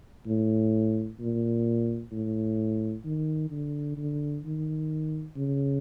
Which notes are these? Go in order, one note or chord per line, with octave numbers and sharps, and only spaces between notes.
A2
A#2
A2
D#3
D3
D3
D#3
C#3